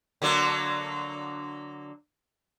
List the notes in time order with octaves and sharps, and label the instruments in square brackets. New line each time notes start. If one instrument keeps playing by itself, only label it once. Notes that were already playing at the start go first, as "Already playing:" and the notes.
[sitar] D3 F#3 A#3